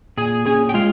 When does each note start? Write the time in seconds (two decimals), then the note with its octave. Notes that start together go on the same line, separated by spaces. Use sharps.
0.17 A#2 G#4 G#5
0.46 C#4 G#4 G#5
0.69 G5
0.74 G#3 F4 F5